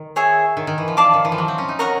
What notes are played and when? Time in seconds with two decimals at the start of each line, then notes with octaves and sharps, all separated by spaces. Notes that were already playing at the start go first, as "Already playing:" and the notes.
Already playing: D#3
0.16 G#4 C#5 E5 G#5
0.57 D#3
0.67 D#3
0.78 E3
0.88 F3
0.97 D5 F5 A5 D6
1.14 D#3
1.25 E3
1.32 F3
1.38 F#3
1.48 C4
1.58 C#4
1.68 D#4
1.79 A#4 C#5 F#5 A#5